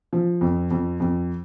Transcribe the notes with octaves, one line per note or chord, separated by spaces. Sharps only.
F3
F2
F2
F2